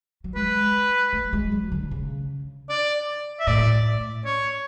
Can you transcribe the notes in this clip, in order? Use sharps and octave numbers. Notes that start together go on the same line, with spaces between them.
F#3
G#3 B4
A3
G#3
F#3
D3
C#3
D5
E5
A2 D5
C#5